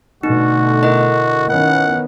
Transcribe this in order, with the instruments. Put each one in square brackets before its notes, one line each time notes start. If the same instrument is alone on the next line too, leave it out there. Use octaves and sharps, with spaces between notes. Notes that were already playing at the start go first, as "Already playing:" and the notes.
[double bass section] B2 D3 A3 [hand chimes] D#4 [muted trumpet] F#4
[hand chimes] E4 A#4 D#5
[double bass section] D#3 B3 C#4 [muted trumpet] F#5